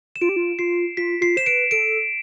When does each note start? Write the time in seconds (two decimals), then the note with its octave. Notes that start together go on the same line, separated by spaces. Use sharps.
0.16 E7
0.21 F4 D7
0.29 G4
0.36 F4
0.59 F4 C7
0.97 F4 B6
1.21 F4 C7
1.37 C5 E7
1.46 B4 D7
1.71 A4 D7